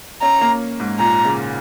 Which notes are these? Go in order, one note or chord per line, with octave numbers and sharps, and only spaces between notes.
C#4 A#5
A#3
G#2
A#2 A#5
C#3